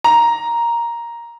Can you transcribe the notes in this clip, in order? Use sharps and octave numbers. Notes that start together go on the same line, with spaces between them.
A#5